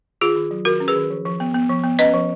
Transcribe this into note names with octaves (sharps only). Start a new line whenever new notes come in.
D#3 F4 G#4
D#3
F#3
D#3 F#4 A#4
C#4
G#4 B4
D#3
F3
F3
B3
B3
F3
B3
C#4 B4 D#5
F3